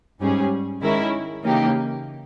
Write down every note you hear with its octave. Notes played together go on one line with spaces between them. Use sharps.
G#2 G3 C#4 G#4
D#3 G#3 C#4 E4 A#4
C#3 E3 A#3 D#4 G4